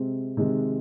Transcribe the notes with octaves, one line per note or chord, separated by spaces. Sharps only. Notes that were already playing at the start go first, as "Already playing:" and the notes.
Already playing: C3 G#3 C4
C3 D#3 G#3